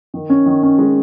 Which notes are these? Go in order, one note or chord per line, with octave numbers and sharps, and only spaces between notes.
D#3
C#4
D#3
C#4
G#3